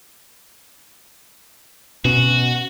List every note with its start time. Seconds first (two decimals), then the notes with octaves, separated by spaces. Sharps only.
2.05 B2 C#4 F#4